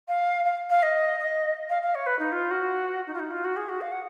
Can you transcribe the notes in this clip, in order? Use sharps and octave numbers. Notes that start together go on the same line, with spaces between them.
F5
F5
F5
D#5
D#5
F5
F5
C#5
B4
D#4
F4
F#4
D#4
F4
D#4
F4
F#4
G#4
F#4
F5
F#5